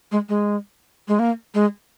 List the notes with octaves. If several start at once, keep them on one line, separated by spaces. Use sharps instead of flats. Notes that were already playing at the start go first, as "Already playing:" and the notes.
G#3
G#3
G#3
A#3
G#3